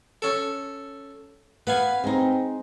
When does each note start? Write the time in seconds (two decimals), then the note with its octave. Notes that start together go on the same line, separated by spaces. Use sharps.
0.22 C#4 A4
1.67 B3 B4 F5 G#5
2.04 G#3 C4 D#4